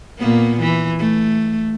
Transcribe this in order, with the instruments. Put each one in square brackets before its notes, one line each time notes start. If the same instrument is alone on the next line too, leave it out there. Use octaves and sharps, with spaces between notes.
[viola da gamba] A#2 A#3 B3
E3
A3